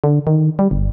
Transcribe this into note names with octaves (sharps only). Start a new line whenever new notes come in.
D3
D#3
G3
G1